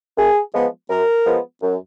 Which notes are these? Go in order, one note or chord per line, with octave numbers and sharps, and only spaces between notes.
F#2 G#4
F3 G#3 B3
F#2 A#4
F3 G#3 B3
F#2